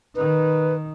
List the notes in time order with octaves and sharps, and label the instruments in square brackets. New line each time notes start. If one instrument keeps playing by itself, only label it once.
[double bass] D#3 D#4 [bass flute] B4